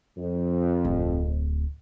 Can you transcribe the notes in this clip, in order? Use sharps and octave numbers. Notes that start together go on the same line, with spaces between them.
F2
D1